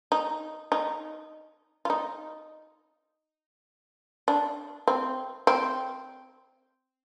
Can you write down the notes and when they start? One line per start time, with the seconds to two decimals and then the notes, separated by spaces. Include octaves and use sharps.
0.12 D#4
0.72 D#4
1.85 F4
1.90 D#4
4.28 D4
4.88 C4
5.47 C4